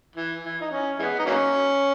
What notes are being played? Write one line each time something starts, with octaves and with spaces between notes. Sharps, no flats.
E3
E3
D#4
C#4
E3 G#3 B3
D#4
F#3 A#3 C#4